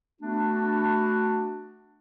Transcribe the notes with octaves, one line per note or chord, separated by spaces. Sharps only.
A3 B3 D4 F#4